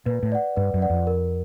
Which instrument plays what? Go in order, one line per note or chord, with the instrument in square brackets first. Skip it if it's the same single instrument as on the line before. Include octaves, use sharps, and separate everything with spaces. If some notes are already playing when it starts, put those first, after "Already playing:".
[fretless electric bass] A#2 [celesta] B4
[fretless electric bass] A2
[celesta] D5 F#5
[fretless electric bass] G2 [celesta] B4
[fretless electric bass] F#2
[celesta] D5 F#5
[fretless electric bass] F2
[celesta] A#4